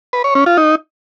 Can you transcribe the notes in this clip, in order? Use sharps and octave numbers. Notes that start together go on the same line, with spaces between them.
B4
C#5
C#4
F4
D#4